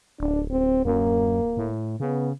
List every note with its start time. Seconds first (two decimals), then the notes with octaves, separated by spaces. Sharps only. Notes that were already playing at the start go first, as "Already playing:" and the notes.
0.20 D1 D4
0.51 C4
0.85 F#2 A#3
1.57 A2
2.00 C#3 B3